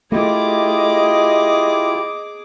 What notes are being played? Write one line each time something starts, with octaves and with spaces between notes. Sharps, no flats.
A3 E4 F4 G4 G#4 D#5 D6